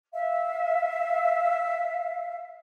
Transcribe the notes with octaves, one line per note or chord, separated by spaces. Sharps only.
E5 F5